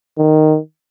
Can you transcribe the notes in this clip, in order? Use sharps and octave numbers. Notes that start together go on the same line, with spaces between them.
D#3